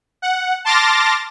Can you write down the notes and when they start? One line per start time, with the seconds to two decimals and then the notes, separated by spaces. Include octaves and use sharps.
0.22 F#5
0.65 A5 C6 D6 F6 A6 A#6